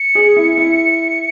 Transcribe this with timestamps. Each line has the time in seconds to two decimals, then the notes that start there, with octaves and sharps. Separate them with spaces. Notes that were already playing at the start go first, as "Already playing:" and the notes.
Already playing: C#7
0.15 G#4
0.36 E4
0.58 E4